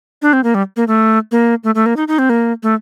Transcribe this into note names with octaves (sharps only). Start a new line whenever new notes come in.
D4
C4
A#3
G3
A#3
A3
A#3
A3
A3
A#3
D#4
D#4
C4
A#3
A3